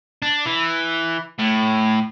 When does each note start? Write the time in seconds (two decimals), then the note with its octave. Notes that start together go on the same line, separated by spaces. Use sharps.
0.22 D4
0.46 E3
1.39 A2